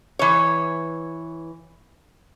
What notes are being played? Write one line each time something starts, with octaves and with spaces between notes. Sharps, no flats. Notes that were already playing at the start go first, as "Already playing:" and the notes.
E3 C#5